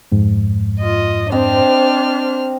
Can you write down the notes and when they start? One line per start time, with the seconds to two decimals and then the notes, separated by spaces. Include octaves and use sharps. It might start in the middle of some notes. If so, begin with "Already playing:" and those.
0.12 F2 G#2
0.80 F4 D#5
1.32 C4 D4 C5 D#5 F6